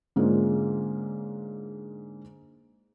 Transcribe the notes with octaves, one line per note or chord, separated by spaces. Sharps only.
G#2 D3 G#3 A#3 C#4 F4